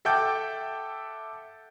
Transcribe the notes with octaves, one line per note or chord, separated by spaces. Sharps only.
A4 E5 F#5 G5 D6 G6